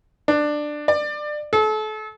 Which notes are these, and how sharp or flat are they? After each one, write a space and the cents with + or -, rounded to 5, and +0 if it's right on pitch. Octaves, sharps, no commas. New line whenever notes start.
D4 +15
D5 +25
A4 -35